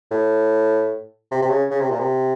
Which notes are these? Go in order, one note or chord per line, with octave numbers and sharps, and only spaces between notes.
A2
C3
C3
C#3
C#3
C3
A#2
C3